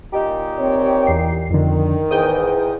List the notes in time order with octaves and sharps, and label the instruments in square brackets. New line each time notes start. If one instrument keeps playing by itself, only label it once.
[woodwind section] A#2 D#4 G4
[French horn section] C4 C#5
[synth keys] E2 C7
[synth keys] F2 D3 [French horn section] D#3
[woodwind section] E2 G#2 [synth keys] G5 D#6